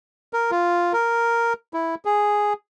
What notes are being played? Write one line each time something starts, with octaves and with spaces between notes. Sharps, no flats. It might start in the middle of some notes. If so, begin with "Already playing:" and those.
A#4
F4
A#4
E4
G#4